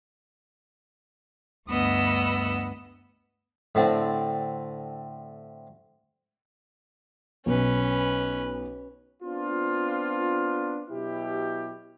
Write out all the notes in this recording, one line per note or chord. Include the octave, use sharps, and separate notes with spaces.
D2 G2 B3 D#5 B5 E6
A2 D3 C4
B1 C#4 B4
B3 C4 D4 F4
B2 F#3 E4 G4